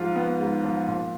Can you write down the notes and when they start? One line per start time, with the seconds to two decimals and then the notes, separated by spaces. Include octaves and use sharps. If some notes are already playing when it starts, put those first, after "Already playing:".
Already playing: G#2 F3 F4
0.16 B3
0.40 G#2
0.64 F3
0.88 A#2